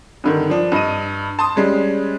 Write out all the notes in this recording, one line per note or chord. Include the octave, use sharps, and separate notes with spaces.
G2 D3 D#3
F3 D4
G2 D#5 D#7
A5 C6 D#6
G3 G#3 C#4